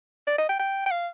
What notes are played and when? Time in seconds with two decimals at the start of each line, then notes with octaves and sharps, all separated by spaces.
0.27 D5
0.38 D#5
0.49 G5
0.59 G5
0.86 G5
0.91 F5